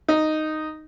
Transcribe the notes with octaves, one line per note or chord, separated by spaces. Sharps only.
D#4